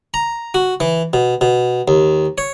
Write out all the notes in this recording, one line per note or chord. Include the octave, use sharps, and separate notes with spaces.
A#5
F#4
E3
B2
B2
D#2
C#5